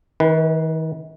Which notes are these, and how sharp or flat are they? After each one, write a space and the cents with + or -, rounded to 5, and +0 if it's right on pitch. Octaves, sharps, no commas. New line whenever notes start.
D#3 +40 B4 +0